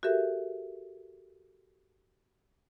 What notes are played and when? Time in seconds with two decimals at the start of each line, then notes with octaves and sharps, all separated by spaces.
0.03 F#4 G4 A4 A#4 E5